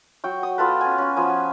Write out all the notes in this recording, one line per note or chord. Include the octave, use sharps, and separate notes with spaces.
F#3 G5 C#6
D#6
B3 F4 A4 B4
C#4 G#5
C#4 F#4
F3 B3 G#5